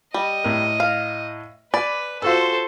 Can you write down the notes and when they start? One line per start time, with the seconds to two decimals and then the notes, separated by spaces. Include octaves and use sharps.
0.14 G3 D#5
0.44 A2 A#4
0.80 F5
1.74 B4 D5 G#5 B5
2.22 F4 F#4 A4 C5 E6